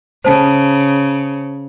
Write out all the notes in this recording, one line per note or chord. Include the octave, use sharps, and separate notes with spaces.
C#3 C5 A5